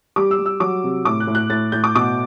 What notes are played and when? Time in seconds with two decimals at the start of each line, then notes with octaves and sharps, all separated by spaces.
0.16 G3 D6
0.31 E6
0.38 G3
0.46 E6
0.60 F#3 D6
0.84 C3
1.05 A2 D6
1.20 F#6
1.27 A2
1.35 F#6
1.50 A2 A6
1.72 A2 G6
1.84 D6
1.95 B2 D6